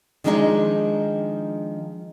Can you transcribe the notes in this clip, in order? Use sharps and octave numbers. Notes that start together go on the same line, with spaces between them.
D#3 F3 G#3 D4 D#4 G#4